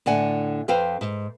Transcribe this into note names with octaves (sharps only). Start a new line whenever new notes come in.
A2 D3 D5 F#5 G#5
F2 C4 B4 C5 F5 G5
G#2